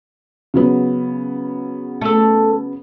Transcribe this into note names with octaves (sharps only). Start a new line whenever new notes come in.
C#3 F#3 B3
A3 A4